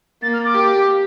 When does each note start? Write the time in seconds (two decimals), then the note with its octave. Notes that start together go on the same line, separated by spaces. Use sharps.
0.23 A#3 A6
0.33 F6
0.44 D6
0.55 G4